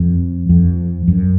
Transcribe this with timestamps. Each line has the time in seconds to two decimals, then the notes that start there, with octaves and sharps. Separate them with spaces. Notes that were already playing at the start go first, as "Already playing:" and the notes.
Already playing: F2
0.49 F2
1.08 F#2